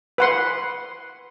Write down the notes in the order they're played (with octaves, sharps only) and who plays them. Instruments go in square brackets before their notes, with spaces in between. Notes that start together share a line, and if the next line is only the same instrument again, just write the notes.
[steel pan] B4 F#5 C6